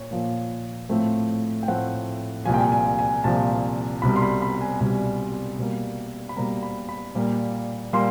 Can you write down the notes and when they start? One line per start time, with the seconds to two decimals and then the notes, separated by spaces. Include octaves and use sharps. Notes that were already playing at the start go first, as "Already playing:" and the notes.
Already playing: A#2 C#5
0.11 A#2 F3 A#3
0.89 A2 F3 A3 C4
1.63 G5
1.68 A2 F3 A3 C4 F#5
2.46 C2 A#2 F3 G#5
2.54 G5
2.61 G#5
2.72 G#5
2.99 G#5
3.24 C2 A#2 F3 A5
4.02 C2 B2 G3 B5
4.16 C6
4.22 B5
4.42 B5
4.61 G#5
4.80 C2 B2 G3 G#5
5.59 B2 G3 A#3
6.29 B5
6.36 B2 G3 A#3 A#5
6.63 B5
6.89 B5
7.15 A#2 G3 A#3
7.93 A#2 G3 A#3 C6